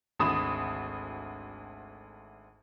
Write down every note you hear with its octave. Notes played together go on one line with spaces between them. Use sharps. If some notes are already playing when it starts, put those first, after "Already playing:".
G#1 D2 B5 D#6 E7